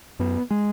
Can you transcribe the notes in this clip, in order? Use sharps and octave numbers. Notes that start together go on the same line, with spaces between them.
F#2 B3
G#3